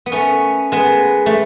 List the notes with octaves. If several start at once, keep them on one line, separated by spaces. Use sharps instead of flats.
B3
A3 C#4
G#3 B3
A3